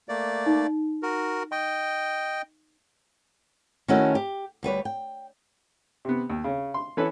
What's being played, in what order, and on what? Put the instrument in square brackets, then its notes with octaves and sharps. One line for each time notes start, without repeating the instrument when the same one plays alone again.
[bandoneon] A3 A#3 D5
[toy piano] D#4
[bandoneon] F#4 A#4
[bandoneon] D#5 G5 [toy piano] C#6
[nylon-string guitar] D#3 A3 C#4 E4 F#4 A4
G4
D2 G3 B4 C#5
G5
[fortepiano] C3 B3
D#2
C#3 C#4
C6
E3 C#4 A4 B4